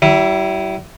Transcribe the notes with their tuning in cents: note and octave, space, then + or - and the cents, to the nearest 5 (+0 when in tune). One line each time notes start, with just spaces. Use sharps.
G3 -40 E4 +0